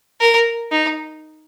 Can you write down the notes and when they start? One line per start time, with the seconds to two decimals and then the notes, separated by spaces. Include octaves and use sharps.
0.21 A#4
0.72 D#4